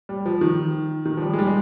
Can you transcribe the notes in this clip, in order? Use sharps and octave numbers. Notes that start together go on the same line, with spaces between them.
G3
F3
D#3
D#3
F3
G3
G#3
G3
G#3